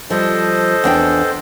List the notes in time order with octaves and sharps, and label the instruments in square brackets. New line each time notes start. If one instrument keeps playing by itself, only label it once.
[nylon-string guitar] F3 G3 [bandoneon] A4 C5 D#5
[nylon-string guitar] E2 D4 G5